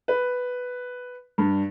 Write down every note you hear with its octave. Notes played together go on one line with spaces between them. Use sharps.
B4
G2